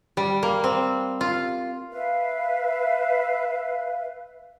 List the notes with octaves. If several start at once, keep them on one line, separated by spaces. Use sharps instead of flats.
G3
A#3
C4
F4
B4 E5 F5